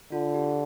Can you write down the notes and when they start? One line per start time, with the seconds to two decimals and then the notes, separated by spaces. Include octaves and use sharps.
0.12 D3 F4
0.34 G4